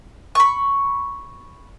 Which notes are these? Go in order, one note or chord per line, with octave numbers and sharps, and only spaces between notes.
B5 C#6